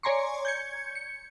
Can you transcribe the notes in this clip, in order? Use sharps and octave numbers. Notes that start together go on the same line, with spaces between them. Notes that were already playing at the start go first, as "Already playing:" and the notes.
C#5 D5 G#5 A#5 C6 C#6
G6 G#6 C#7
C#7